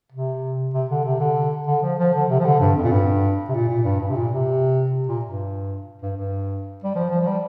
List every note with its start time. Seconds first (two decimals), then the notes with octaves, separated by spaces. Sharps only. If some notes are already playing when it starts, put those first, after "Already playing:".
0.12 C3
0.74 C3
0.90 D3
1.05 C3
1.20 D3
1.67 D3
1.83 F3
1.99 F3
2.14 D3
2.30 C3
2.40 F3
2.45 D3
2.60 G2
2.76 F2
2.84 A#2
2.91 G2
3.49 C3
3.54 A#2
3.69 A#2
3.85 G2
4.00 G2
4.09 C3
4.16 A#2
4.32 C3
5.09 A#2
5.25 G2
6.02 G2
6.17 G2
6.84 G3
6.95 F3
7.10 F3
7.21 F3
7.27 G3